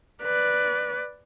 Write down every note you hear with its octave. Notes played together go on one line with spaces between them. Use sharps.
B4 D5